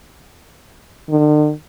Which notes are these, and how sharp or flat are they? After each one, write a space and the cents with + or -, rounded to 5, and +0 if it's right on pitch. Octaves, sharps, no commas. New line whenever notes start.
D3 +45